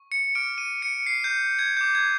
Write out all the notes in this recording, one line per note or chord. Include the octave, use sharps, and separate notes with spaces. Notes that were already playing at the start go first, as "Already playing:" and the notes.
Already playing: C#6
C#7
D6 F6 D7
D#7
C#7
C7
G6
G#6
G6
D6
G#6